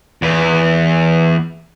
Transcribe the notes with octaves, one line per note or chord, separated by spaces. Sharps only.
E2 B4